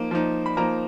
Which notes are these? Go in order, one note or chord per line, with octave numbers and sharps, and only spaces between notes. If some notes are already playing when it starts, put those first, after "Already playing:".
Already playing: F3 A#3 D#4
F3 A#3 D#4
B5
F3 A#3 D#4 A#5